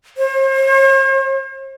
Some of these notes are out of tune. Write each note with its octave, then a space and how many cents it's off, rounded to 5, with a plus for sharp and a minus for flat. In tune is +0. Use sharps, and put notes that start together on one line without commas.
C5 +45